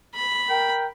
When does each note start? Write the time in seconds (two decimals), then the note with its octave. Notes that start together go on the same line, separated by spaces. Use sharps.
0.15 B5
0.48 A#4 G5